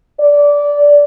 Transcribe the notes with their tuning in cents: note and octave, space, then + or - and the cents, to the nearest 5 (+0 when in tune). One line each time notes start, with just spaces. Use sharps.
D5 -15